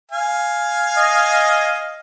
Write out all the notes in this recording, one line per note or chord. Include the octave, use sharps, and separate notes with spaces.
F5 G#5
D#5